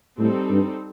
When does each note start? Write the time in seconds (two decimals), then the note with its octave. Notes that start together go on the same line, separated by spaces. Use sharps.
0.19 A2 G3 C4 D#4 A4
0.51 G2